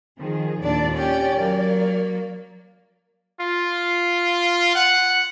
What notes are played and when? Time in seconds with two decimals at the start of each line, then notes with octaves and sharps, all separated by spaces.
0.19 D#3 F3 G#4
0.63 D#2 A#2 D4 D5
0.95 C#4 G4 D5
1.38 F#3 A#3
3.41 F4
4.75 F#5